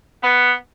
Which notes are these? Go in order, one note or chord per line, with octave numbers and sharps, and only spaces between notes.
B3